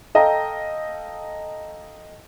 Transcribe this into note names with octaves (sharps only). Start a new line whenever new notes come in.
A4 D#5 F5 G5 A#5